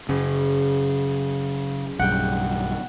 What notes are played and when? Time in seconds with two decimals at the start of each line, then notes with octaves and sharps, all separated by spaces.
0.09 F#1 C#3
1.99 B1 G2 F#5 G5